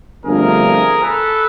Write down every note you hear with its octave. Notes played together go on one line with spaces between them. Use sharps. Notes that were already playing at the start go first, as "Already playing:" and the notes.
G1 F2 D3 F3 A3 G#4 A#4
A4 B4